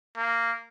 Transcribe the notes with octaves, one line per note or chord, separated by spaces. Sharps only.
A#3